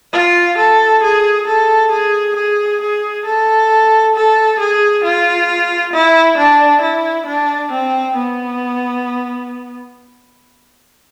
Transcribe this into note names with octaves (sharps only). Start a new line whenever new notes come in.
F4
A4
G#4
A4
G#4
G#4
G#4
A4
A4
G#4
F4
E4
D4
E4
D4
C4
B3